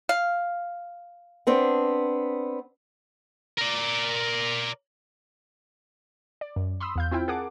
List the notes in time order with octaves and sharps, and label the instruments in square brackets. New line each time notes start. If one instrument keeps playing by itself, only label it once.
[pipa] F5
[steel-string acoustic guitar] B3 C4 D4
[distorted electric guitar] A#4 D5
[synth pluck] D5
F#2
B5 C6 D#6 E6
E2 F5 G6
C4 E4 F4 G5
G#4 A#4 F#5 A5 D6